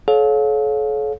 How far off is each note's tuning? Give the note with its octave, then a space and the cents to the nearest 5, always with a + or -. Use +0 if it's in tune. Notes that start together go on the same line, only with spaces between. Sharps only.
A4 -40 C#5 -5 F5 +25